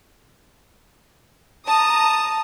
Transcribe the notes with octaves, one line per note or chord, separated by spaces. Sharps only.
A5 A#5 D#6